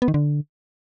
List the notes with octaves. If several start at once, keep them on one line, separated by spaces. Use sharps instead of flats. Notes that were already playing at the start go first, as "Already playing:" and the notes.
B3
D#3
D3